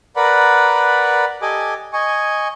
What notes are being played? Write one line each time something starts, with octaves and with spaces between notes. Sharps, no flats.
A#4 B4 D5 F#5 B5
G4 A4 D#5 G#5 D6
D#5 G#5 C#6